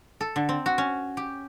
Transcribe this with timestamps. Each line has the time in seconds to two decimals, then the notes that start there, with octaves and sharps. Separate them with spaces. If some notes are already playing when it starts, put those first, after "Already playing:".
0.21 A4
0.36 D3
0.49 C4
0.66 F#4
0.78 C#4
1.17 G4